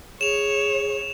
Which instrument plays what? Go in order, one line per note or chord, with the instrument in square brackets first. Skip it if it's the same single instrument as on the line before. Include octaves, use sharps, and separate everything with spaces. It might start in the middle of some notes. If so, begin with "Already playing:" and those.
[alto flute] G#4 [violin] C#5 [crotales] E7 F7